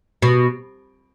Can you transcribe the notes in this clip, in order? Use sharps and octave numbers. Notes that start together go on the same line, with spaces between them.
B2